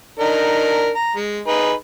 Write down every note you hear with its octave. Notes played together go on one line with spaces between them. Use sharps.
D4 D#4 A#4
A#5
G#3
D#4 G#4 B4